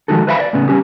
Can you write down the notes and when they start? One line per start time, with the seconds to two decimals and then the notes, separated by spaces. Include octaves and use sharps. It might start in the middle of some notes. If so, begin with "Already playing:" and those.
0.08 D#3 F3 G#3 D#4 F#4 A4
0.27 B4 C5 E5 F5 G5 B5
0.40 D5
0.53 A2 C#3 B3 C#4
0.69 G3 C#4 G4